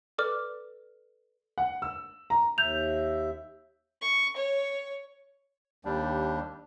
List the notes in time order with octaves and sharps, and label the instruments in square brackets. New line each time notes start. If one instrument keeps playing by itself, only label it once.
[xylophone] A4 B4 D5 D6 F6
[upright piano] F#5
E6
A#5
[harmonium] D#2 E5 [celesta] G6 F7
[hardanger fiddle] C#6
C#5
[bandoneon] D#2 G3 D4